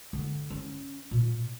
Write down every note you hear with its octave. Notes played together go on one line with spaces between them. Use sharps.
D3
C#4
A#2